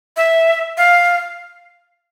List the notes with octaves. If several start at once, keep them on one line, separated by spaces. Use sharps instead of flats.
E5
F5